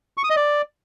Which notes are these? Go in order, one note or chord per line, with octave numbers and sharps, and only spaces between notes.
C#6
D#6
D#5
D5